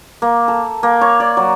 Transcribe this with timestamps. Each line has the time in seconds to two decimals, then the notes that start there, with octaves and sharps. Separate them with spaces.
0.22 A#3
0.48 A4
0.83 A#3
1.01 C#5
1.20 D5
1.37 F#3